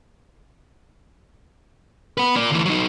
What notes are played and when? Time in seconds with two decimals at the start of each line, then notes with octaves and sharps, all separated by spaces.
2.18 B3 B4
2.36 A#3 D5
2.51 D2 E3
2.65 F#3 D#4